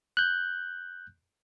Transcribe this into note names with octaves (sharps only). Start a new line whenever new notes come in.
F#6 G6